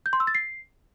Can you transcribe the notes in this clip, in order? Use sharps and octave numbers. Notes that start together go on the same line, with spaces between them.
G6
C6
E6
A6
C7